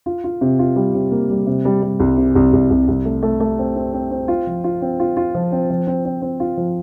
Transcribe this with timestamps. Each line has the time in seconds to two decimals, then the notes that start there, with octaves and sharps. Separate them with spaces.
0.06 F4
0.24 F4
0.41 C3
0.59 F4
0.76 G3
0.94 C3
1.12 A#3
1.30 G3
1.47 C3
1.65 G3
1.83 G3
2.00 C2
2.17 C3
2.35 C2
2.53 C2
2.70 C2
2.88 C2
3.05 A3
3.23 A3
3.40 A3
3.59 C4
3.76 C4
3.94 C4
4.11 C4
4.28 F4
4.47 F3
4.64 F4
4.82 C4
5.00 F4
5.17 F4
5.35 F3
5.52 C4
5.70 F3
5.87 C4
6.05 C4
6.22 C4
6.40 F4
6.57 F3